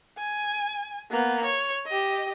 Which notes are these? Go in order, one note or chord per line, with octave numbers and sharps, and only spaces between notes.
G#5
A#3 B3
C#5
G4 D#5